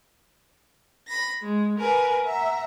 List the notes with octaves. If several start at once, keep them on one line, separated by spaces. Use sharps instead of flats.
B5 A#6
G#3
A#4 B4 G#5
E5 F#5 A#5